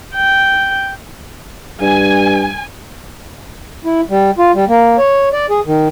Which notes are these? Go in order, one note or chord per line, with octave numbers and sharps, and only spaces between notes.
G5
G2 G#5
E4
G3
F4
G3
A#3
C#5
D5
G#4
D#3